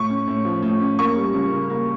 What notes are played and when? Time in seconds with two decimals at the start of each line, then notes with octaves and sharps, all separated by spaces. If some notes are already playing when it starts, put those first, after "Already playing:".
Already playing: A2 C#6
0.10 C#4
0.27 A2
0.45 F3
0.62 A2
0.80 C#4
0.99 A#3 C#6
1.16 G3
1.34 C#2
1.52 C#3
1.70 A#3